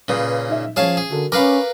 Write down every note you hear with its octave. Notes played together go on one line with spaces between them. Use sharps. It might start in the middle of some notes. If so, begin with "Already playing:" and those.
A#2 C#3 C#4 B4 D#6
D#4 E5
F3 C#4 G#4 C#5 F5 A5
G#4
D3 F#4 A4 A#4
C#4 A#4 B4 F5 B5 D6